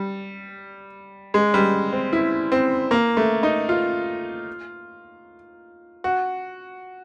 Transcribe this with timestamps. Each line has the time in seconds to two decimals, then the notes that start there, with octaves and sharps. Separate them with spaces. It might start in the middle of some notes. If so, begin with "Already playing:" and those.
Already playing: G3
1.34 G#3
1.54 G3
1.93 C4
2.13 E4
2.52 C4
2.91 A#3
3.17 A3
3.43 D#4
3.69 F4
6.04 F#4